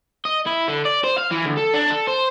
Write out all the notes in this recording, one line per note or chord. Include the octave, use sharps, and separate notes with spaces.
D#5
E4
D3
D5
C5
F5
E3
D2
A4
D4
A4
C5